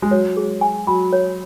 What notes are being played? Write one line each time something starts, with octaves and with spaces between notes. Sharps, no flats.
G#3
F#3 C#5
G#4
G#5
F#3 B5
C#5